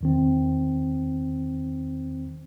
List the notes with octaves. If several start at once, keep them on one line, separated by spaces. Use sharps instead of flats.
E2 D#3 C4